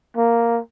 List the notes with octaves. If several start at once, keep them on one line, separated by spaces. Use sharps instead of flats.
A#3